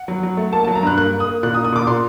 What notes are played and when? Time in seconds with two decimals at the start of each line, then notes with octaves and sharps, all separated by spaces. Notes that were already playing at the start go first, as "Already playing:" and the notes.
Already playing: F#5
0.08 F#3
0.23 F#3
0.37 A3
0.53 A#3 A5
0.64 F#3 A5
0.75 A#5
0.83 G2 F#6
0.97 A#3 F#6
1.12 A#3
1.20 D#6
1.27 A#3
1.43 A#2 F#6
1.54 D#6
1.58 A#2
1.64 D#6
1.72 A#2 D6
1.87 A#2 C6